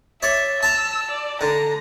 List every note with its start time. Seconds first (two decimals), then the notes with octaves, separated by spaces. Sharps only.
0.23 C#5 D5 E5
0.63 A5 A#5 E6
1.11 D5
1.41 D3 A#5